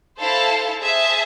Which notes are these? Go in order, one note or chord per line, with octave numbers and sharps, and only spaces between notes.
E4 A4 C5 F5 A5
G#4 C5 E5 A5